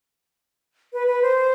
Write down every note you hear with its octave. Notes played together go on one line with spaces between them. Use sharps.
B4
B4
C5